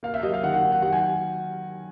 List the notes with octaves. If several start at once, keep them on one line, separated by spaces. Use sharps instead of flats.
A#3 F5
E5
F#3 D#5
F5
D#3 F#5
F#5
D#3
F#5
F#3 F#5
G#5